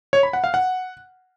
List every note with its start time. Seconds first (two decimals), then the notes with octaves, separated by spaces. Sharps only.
0.13 C#5
0.23 B5
0.33 F#5
0.44 F5
0.54 F#5